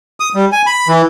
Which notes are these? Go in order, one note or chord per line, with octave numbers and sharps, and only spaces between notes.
D#6
G3
G#5
B5
E3